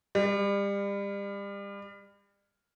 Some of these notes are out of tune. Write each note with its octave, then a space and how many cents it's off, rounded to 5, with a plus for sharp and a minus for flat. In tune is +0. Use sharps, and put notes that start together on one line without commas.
G3 +35